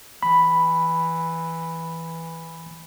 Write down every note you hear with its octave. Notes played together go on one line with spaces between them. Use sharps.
E3 B5